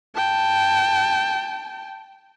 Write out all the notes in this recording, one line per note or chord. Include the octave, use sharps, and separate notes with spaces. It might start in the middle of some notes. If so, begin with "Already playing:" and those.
G5 A5